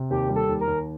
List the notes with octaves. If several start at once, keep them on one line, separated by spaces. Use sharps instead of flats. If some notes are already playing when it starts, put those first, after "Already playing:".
Already playing: C3
D#2 G4
G3
A4
D#2
A#4
D#2